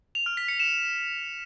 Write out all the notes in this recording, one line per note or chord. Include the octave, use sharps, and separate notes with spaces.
F7
F6
B6
C#7
E7